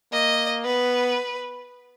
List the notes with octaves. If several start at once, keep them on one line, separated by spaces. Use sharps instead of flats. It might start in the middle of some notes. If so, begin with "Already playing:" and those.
A#3 D#5
B3 B4